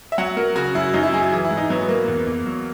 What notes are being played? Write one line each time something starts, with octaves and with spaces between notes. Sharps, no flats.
E5
F#3 F#5
F#3 A#4
C#3 F#4
F#2 E4
F#2 D#4
E4
F#3 G#4
E3 G#4
E4
G#2
D#4
F#3 B3
B3
F#3 A#3
E2
E2
F#3